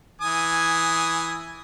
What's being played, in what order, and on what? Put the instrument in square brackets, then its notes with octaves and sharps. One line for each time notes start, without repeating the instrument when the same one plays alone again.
[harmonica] E3 G#5 D#6